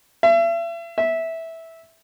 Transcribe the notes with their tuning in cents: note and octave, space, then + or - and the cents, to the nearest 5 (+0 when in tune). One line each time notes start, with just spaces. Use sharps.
E5 +40
E5 -10